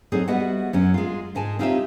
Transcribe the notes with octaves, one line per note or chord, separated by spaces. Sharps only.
F#3 C4 D#4 G#4 A4
G3 B3 F#4 D#5 E5 F#5
F#2 F#3 C#4
G#3 F4
G#2 G#3 G#5 A5
C4 D#4 F4 G4 C#5 E5